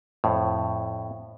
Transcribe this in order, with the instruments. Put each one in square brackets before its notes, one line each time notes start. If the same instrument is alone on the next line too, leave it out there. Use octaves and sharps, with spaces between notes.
[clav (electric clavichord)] F2 A2